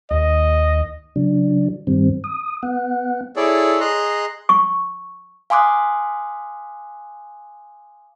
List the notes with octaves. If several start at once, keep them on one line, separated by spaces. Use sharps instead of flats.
D#2 D#5
C#3 F#3 D4
G2 D#3 G3 C4
D#6
B3 F#5
E4 G#4 A4 C#5 D5
G#4 D#5 A#5 C6 F#6
C#6
F5 G#5 C6 D6 D#6 F#6